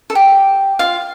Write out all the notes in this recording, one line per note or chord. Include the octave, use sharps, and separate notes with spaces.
A4
G4
F4 F5